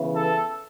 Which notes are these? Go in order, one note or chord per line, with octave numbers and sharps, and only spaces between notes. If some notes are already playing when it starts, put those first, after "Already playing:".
Already playing: C#3 E3 B3
A4